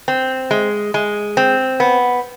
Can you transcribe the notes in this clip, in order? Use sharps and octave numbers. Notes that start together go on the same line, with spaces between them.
C4
G#3
G#3
C4
B3